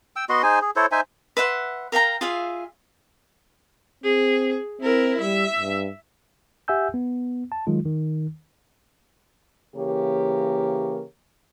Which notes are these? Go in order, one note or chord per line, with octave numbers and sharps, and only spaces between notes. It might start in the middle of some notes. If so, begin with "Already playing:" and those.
G5 E6
B3 F#4 D#5 C6
D#4 G#4 C5 G#5
G#4
E4 A4 C5 C#5
D#4 C5 E5 G#5
B4 E5 F#5 C6
A#4 F5 G5 A#5
F4 G#4 E5 F5
C4 G#4
C4 E4 A#4
G3 E5
G2
G4 E5 F#5 G#5 E6 G6
B3
A5
D#3 F#3 G#3 F4
D#3
C#3 E3 A#3 G4 A#4 C#5